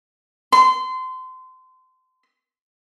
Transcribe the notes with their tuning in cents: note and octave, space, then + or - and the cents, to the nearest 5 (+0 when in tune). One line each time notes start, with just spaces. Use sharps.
C6 -25